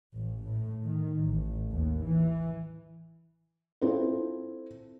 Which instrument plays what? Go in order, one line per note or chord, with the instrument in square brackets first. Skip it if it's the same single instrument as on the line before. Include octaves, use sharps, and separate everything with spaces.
[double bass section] A1
A2
D#3
A1
D#2
E3
[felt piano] C4 E4 F4 A4 C5